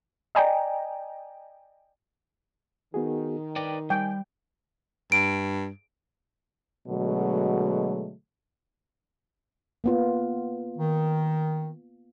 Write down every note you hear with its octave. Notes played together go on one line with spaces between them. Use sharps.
D5 D#5 G5 G#5 A#5
D#3 B3 F#4 G#4
B4 D5 G5 D6
G3 G5 G#5
G2 D7
B2 D3 F#3 G#3 A3
A#3 B3 F4
D#3